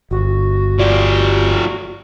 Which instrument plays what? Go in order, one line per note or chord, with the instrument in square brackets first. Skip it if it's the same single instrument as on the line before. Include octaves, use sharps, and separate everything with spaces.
[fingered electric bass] G1 [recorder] F#4
[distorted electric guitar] F3 G4 [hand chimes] D5